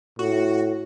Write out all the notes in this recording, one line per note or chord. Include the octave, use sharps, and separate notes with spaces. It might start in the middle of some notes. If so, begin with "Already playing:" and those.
A2 F#4